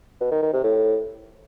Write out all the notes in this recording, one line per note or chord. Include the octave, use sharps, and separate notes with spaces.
B2
D#3
D#3
C3
A2